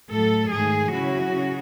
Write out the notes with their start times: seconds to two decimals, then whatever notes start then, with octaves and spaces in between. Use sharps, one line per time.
0.10 A2 F#3 A3 A4
0.50 G#2 D#3 A3 G#4
0.91 C#3 F#3 C#4 E4 F#4
1.31 C#3